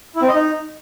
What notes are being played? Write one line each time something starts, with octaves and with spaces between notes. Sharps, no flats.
E4
C4
D#5
D#4